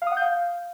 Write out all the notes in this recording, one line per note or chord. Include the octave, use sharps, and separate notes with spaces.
F5
D#6
F#5
G6
F5